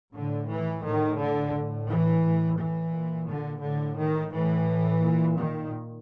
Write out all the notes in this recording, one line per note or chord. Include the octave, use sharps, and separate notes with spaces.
A2 D3
E3
A2 D#3
D3
A2
E3
A2
E3
A#2
D3
A2 D3
D#3
A2 E3
A#2
D#3